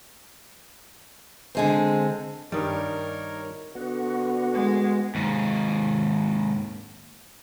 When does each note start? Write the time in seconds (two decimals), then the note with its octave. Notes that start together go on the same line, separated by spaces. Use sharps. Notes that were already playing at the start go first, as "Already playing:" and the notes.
1.55 D3 G#3 C4
2.52 G2 D#3 G3 D#4 A#4 C#5 D5
3.75 D3 B3 F#4
4.53 G#3
5.15 D#2 G#2